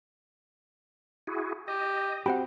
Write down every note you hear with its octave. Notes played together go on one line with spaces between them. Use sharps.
E4 F#4 G#4
G4 D#5
C4 F#4 G4 F#5 G5 B5